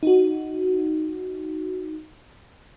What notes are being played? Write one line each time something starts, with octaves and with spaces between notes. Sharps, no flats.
D#4 F#4